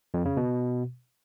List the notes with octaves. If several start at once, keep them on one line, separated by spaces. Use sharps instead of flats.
F2
C#3
B2